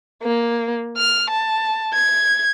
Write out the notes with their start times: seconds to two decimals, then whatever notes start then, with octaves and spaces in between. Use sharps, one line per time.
0.23 A#3
0.98 F6
1.30 A5
1.94 G#6